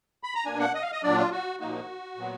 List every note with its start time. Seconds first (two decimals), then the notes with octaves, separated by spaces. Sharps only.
0.24 B5
0.35 A#5
0.45 B2 A#3 D4 G#5
0.60 F#5
0.75 D#5
0.82 F5
0.92 D#5
1.03 A#2 F#3 D4 D5
1.17 F4
1.31 F#4
1.60 A#2 F3 A#3 D#4 F#4
2.17 A#2 F#3 B3